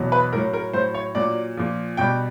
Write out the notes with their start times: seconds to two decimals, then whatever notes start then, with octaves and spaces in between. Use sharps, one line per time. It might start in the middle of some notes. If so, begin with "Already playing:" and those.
Already playing: E2 B2 F#3
0.12 B4
0.33 A2 F#3 A#4
0.53 A#4
0.73 A2 F#3 C5
0.94 C#5
1.15 A#2 F#3 D5
1.57 A#2 F3
1.97 B2 G3 G5